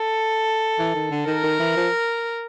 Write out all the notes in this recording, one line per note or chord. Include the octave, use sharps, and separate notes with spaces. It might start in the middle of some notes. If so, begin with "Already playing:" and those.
Already playing: A4
E3
D#3
D3
D#3 A#4
D#3
E3
F3